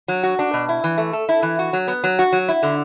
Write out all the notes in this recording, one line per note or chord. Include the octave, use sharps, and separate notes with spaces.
F#3
F#4
D4
B2
E4
E3
A3
A4
E4
E3
F#4
F#3
B3
F#3
F#4
F#3
E4
D3